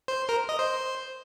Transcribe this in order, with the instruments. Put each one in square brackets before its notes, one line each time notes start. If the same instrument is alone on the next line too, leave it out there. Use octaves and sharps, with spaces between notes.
[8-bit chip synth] C5
A#4
D#5
C5